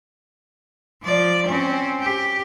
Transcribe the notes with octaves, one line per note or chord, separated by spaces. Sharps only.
F3 D5
C4 C#4
G4